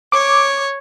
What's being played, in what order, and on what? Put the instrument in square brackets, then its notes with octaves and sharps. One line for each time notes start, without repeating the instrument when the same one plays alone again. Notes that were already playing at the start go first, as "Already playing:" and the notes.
[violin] C#5 [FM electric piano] D6